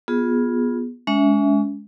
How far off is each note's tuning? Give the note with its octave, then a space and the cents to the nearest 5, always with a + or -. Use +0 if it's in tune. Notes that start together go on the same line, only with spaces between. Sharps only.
B3 -15 F4 +15 G#4 +0
G#3 +10 C#4 +40 E5 +0